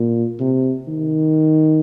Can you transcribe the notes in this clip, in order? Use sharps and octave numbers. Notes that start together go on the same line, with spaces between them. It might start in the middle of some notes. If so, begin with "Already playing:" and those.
Already playing: A#2
C3
D#3